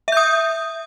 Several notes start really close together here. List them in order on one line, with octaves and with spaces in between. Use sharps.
E5 G6 D#6